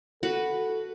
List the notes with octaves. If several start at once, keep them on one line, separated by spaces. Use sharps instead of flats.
F#4 A4 B4